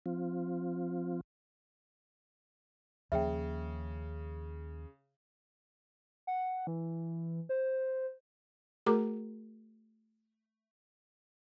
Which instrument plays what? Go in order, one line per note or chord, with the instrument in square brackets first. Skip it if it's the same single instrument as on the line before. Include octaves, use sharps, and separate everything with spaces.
[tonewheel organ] F3 C4 F4
[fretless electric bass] D#2 F3 A#3 [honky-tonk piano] C#3 [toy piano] E5 G5
[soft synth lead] F#5
E3
C5
[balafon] A3 F#4 G#4 A#4 A#5 D6